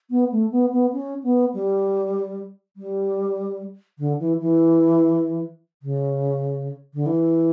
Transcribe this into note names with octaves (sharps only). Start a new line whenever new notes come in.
B3
A3
B3
B3
C#4
B3
G3
G3
D3
E3
E3
C#3
D3
E3